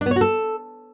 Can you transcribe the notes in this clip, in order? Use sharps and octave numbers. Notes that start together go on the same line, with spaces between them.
D4
B3
C#5
F#4
A4